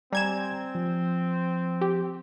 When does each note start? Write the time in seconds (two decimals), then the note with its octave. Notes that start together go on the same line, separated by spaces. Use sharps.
0.13 G3 C4 D5 G#5 A#5 G#6 E7
0.75 F3
1.81 G4